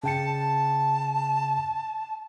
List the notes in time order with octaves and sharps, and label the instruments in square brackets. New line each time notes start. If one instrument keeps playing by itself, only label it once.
[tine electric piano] C#3 G5 C#7 [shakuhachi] A5